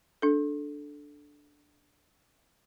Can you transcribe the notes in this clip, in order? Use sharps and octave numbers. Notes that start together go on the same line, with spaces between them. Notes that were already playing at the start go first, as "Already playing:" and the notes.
D4 A4